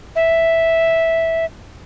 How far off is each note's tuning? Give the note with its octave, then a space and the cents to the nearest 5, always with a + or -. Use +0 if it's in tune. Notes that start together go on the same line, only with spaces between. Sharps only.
E5 -5